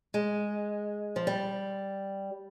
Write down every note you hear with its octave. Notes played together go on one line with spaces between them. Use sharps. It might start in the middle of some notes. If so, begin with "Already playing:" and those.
G#3
F3
G3